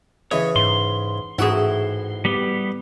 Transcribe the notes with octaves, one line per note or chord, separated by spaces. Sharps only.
C#3 E3 C#5 D#5
G#2 C6
A1 G#2 E4 F#4 G#4 F#5
G3 B3 G4